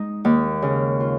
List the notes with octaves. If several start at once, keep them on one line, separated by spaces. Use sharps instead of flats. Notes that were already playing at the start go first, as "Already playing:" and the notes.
Already playing: G#3 D#4
D#2
C#3
F4